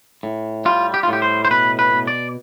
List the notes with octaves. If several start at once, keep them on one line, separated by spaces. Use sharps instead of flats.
A2
G3 F4
G4
F4
A2 G4
C5
C5
B2 B4
B4
B2
D5